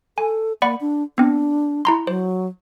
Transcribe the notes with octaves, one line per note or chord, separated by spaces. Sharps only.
A4 G#5
A#3 D5 F#5 B5
D4
B3 C4 D4
E4 A#5 C6
F#3 C5